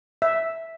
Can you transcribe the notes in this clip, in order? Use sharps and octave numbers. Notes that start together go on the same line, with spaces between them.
E5